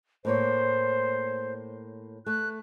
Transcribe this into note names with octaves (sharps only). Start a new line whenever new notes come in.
A2 A#3 C5 C#5
A3 F#6